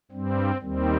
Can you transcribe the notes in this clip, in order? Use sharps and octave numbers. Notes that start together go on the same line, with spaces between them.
G2 G3 C4
D#2 D#3 G3 C4